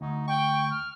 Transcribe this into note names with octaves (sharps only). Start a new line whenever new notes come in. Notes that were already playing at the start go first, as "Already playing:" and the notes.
D2 D#4
G5 C#6
F6